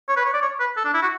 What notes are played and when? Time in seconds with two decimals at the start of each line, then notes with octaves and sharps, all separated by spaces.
0.08 C#5
0.17 B4
0.25 C#5
0.34 D5
0.42 C#5
0.60 B4
0.77 A4
0.85 D4
0.94 E4
1.02 F#4